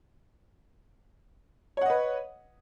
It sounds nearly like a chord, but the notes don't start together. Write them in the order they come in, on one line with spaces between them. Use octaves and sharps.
C#5 F#5 D#5 B4